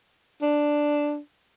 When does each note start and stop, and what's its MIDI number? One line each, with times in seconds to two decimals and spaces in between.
0.42 1.18 62